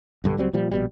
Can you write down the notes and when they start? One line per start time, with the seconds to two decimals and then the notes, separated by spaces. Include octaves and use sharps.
0.24 B1 G2 D3
0.37 C#2 F#3 G3 C4
0.53 A#2 F3 G3
0.71 A#1 B2 G3